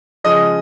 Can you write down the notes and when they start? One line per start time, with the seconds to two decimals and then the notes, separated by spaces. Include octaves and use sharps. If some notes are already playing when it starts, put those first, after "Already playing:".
0.24 C#3 F3 G#3 D#5